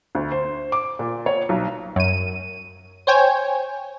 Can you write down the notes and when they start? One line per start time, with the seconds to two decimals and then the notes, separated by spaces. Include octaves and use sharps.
0.15 D2
0.32 C5
0.72 D6
0.99 A#2
1.26 C#5
1.49 B1
1.96 F#2 D#7
3.07 C5 C#5 G5 G#5